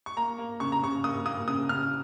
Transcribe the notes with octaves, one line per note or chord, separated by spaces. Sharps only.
C#6
A#3 A#5
A#3
C#3 C#6
A#5
C#3 C#6
A#3 D#6
A#3 D#6
C#3 D#6
C#3 F6